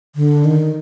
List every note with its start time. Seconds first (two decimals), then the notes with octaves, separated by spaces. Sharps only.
0.16 D3
0.44 D#3